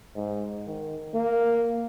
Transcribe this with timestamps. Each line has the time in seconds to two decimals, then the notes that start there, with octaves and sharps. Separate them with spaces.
0.16 G#2
0.67 D#3
1.14 A#3